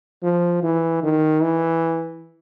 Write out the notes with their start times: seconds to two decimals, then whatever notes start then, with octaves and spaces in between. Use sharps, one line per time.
0.23 F3
0.63 E3
1.03 D#3
1.42 E3